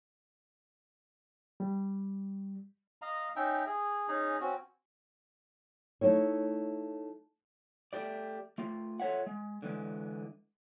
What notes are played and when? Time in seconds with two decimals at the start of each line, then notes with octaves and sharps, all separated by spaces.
1.60 G3
3.02 D#5 F5 A#5
3.36 C#4 D#4 E5 G5
3.67 G#4
4.08 C#4 D#4 G#4
4.41 C4 C#4 F#4
6.01 A3 D#4 E4 C#5
7.93 A3 G4 D5
8.58 A3 F4
9.00 F4 A4 C#5 E5 F#5
9.26 G#3
9.62 D3 E3 G#3